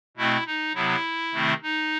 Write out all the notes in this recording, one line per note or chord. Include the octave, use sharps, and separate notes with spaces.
B2 A3 C4 E4
D#4
C3 F#3 B3 E4
C3 D#3 A3 C4
D#4